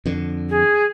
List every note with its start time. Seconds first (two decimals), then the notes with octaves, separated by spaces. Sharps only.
0.06 F2 D3
0.49 G#4